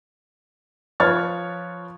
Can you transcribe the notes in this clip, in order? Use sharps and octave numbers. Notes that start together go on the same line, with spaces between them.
F3 B4 C#5 C#6 F6 A6